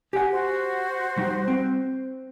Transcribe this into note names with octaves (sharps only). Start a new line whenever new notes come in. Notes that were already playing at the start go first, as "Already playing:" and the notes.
G4 F#5 G#5
F#4 C5
G3 D#4
C4